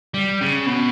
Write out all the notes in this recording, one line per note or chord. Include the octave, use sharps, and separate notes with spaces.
G3
C#3
B2